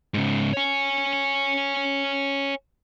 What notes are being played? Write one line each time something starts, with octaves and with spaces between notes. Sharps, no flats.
G#2 C#3
C#5 G#5